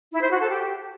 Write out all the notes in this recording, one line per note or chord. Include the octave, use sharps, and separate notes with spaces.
E4
C5
F#4
A4
G4